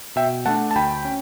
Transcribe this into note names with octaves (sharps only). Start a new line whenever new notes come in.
B2 E5 G5
A3 D4 F#5 A5
A5
D2 G5 B5
C#4